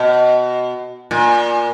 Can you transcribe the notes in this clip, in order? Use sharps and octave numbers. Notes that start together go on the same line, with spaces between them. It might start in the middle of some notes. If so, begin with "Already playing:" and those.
Already playing: B2
A#2